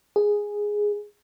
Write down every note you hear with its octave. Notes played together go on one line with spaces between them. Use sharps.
G#4